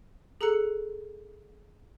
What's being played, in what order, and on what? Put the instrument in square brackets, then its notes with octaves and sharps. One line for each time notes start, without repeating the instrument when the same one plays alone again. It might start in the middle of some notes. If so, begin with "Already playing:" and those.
[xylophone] G#4 A4 A#5 E6 F#6 C#7